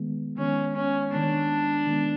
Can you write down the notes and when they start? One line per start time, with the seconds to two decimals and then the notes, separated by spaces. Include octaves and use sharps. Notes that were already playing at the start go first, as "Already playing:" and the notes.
Already playing: D#3 G#3 B3
0.38 D#3 G#3 B3 C#4
0.76 C#4
1.12 D#3 G#3 B3 D4
1.87 D#3 G#3 B3